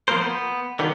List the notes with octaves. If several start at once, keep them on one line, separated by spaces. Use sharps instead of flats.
F3 A#3 B3 A#4 C5
B3
D3 D#3 F3 F#3 B3